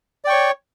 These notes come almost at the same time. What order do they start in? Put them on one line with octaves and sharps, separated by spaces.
D5 G5 C#6 C#5